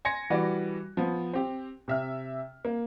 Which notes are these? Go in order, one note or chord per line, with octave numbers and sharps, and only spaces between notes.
G#5 C6 G#6 A#6 C#7
E3 G3 F#4 B4 D5
F3 B3
C4 G4
C3 E5 F6
A#3